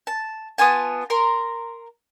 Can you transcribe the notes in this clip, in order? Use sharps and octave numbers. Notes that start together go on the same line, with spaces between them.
A5
B3 F4 G#5 A5
A#4 A#5 C6